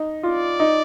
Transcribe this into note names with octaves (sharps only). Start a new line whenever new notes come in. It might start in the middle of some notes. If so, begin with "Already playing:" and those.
Already playing: D#4
F4 D5
D#4